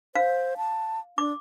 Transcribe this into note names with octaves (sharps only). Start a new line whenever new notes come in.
C5 F5
A5
D4 D6